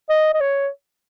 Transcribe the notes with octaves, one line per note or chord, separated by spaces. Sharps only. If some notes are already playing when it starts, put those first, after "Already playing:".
D#5
D#5
C#5